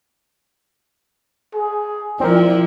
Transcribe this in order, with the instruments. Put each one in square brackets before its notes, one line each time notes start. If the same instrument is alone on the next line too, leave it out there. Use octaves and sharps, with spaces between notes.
[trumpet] G#4
[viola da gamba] F3 E4 [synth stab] C4 A#4 [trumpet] D5